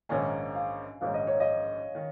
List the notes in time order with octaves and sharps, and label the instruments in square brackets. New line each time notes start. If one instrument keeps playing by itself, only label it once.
[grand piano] A#1 G#2 D#3 A#3 C#4 [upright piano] G#5
[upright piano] F5
[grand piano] A#1 G#2 D#3 A#3 C#4 [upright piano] F5
[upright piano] D#5
C#5
D#5
[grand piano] D#3